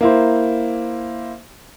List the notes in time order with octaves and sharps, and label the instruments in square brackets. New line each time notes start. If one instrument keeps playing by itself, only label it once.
[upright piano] A#3 E4 C5